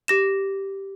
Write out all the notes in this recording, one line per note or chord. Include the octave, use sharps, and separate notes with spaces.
G4 A#6 E7